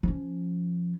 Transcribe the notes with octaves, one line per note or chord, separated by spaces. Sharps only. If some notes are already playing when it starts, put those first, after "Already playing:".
F3 C#4